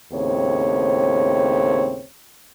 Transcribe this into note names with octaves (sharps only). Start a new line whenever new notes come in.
D#2 A2 C#3 C4 C5 C#5